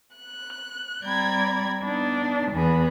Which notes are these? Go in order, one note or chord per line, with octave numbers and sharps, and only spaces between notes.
F#6
G3 C4 D5 A#5 B5 G#6
B3 D4 D#4
E2 E3 B3 G#4 B5